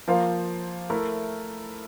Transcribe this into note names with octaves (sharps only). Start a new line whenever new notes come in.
F3 A#3 F4 C5 F5
A3 E4 A#4